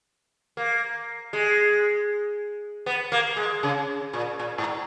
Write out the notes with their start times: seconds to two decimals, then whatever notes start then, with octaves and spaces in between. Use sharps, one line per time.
0.57 A#3
1.33 G#3
2.86 B3
3.12 A#3
3.36 G#3
3.63 C#3
4.13 A#2
4.39 A#2
4.58 G#2